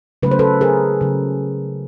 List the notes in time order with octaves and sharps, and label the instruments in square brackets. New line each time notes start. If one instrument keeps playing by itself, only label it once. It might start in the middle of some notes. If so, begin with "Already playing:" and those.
[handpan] C#3 F#3 A3 B4
C5
A4 B4
G#4 A#4
C#3 F#3